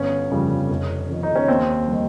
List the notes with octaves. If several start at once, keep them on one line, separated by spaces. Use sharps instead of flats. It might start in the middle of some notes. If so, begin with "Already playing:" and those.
Already playing: G1 C#4
F2 C#3 G3
F1
F2 D#3
D#4
C#4
D#2 C4
D#3 G3